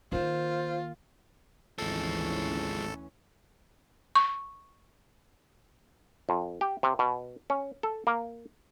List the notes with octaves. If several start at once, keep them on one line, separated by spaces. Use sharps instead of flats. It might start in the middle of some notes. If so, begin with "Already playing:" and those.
D#3 A#3 F4 C5
G#1 D2 E3 F3 G#3 C#4 A4
C#6
F2
G4
C3
B2
C#4
A4
A#3